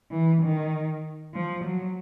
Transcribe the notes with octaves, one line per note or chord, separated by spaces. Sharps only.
E3
D#3
F3
F#3